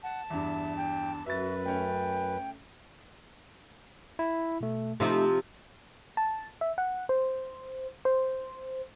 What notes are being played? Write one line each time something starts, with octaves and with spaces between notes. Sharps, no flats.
F#5 A5
E2 G2 E5
G5
F#2 F#4 B4 E5 A6
A3 C#4 G5
E4
B2 A3
C3 F3 A3 D#4 E4
A5
E5
F#5
C5
C5